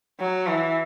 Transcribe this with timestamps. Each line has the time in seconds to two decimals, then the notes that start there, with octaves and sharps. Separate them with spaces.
0.20 F#3
0.47 E3